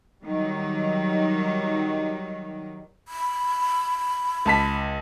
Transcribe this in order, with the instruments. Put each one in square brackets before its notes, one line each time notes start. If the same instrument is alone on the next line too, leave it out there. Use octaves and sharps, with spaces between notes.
[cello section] D#3 F#3 G3
[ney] B5
[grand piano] C#2 A5 B6